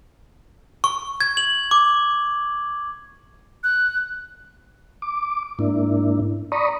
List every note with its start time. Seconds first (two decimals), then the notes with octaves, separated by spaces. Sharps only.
0.84 C#6
1.21 G#6
1.37 F#7
1.71 D6
3.63 F#6
5.02 D6
5.59 G#2 A#3 D4 E4
6.52 D5 A#5 B5 C#6 D#6